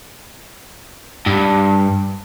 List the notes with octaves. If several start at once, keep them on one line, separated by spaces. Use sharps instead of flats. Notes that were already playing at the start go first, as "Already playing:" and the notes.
G2